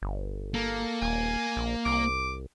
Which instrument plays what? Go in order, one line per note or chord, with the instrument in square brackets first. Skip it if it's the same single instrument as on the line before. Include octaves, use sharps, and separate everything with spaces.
[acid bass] G1
[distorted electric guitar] A#3 [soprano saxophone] A4
[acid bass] D#1 [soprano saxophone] G#5
[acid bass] A#1
[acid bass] C2 [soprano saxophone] D6